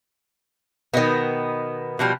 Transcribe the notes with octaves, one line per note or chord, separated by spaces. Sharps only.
B2 D#3 B3 D#5
B2 F3 G3